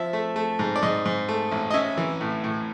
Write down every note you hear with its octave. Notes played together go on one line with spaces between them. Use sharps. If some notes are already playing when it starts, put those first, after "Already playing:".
Already playing: F3 E5
A3
A3
G#2
D5
G#2 D#5
G#2
A3
A1
D#5
C#4 E5
E3
A2
A2